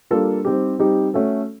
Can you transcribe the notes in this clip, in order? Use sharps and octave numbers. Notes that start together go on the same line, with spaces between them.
G3 A#3 D4 F4 A4
G3 C4 D#4 G4
G3 C4 D#4 G4
A3 C#4 F#4 A4